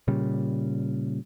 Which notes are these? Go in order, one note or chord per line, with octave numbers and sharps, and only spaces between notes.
A#2 C#3 G3